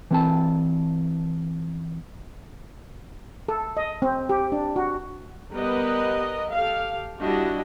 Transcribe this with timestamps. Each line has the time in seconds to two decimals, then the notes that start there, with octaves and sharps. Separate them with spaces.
0.11 E3 C4 A5
3.48 A4
3.77 D#5
4.02 C4
4.29 G4
4.52 D4
4.76 F#4
5.53 G3 B3 A#4 B4 D#5
6.54 G4 A4 F5
7.19 G3 D4 E4 F#4 G4 D#5